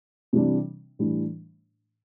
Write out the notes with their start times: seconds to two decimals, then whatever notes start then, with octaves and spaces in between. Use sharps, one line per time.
0.33 C3 E3 G3 D4
0.99 A2 E3 G3 D4